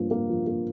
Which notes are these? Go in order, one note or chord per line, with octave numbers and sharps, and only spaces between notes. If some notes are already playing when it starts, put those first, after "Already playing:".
Already playing: G2 F3 A#3
A#3
F3
A#3